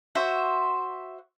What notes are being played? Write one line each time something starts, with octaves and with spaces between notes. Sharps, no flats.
F#4 C5 E5